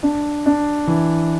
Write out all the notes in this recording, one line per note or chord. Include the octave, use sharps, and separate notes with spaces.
D4
D4
E3